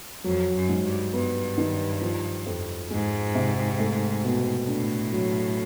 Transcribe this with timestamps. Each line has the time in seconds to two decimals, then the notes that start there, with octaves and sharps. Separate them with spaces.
0.24 F2 F#3
0.54 F#2
0.69 G#2
0.83 G2
1.13 G2 B3
1.58 D#3
2.01 F3
2.46 F2
2.90 G#2 G#3
3.35 C3
3.79 A3
4.24 B2
4.67 A2 D4
5.12 F#3